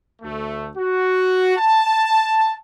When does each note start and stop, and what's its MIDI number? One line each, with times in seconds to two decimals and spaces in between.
0.22 0.69 38
0.22 0.69 57
0.76 1.55 66
1.57 2.56 81